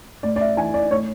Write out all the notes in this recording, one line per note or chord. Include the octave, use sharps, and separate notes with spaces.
A2 D5
D5
E5
E3 G#5
D5
A2 C#5